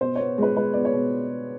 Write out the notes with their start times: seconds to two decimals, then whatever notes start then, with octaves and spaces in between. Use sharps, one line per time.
0.01 B2 C5
0.16 B3 C#5
0.38 G#3 B4
0.57 G#3 B4
0.73 B3 D5
0.85 C#5
0.93 B2